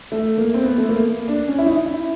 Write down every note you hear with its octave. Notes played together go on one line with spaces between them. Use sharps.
A3
A#3
C4
B3
A3
A#3
D4
C#4
E4
D#4
E4